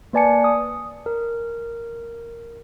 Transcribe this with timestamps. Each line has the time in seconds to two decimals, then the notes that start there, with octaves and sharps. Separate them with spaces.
0.13 A#3 B4 D5 G#5 A5 C#7
0.44 D#6
1.06 A#4